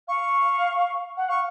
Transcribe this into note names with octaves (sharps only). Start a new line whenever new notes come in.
F5 C#6
F#5
F5 C#6